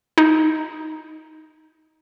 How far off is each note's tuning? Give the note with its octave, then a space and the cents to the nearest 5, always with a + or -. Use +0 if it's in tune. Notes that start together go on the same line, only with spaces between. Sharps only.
D#4 +15